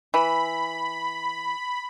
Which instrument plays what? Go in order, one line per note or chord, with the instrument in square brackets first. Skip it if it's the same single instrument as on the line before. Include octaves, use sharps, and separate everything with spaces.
[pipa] E3 [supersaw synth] B5